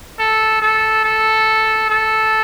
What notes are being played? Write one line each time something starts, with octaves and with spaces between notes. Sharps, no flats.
A4
A4
A4
A4